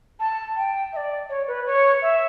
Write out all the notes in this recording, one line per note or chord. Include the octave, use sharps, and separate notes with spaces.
A5
G5
E5
D5
C#5
B4
C#5
E5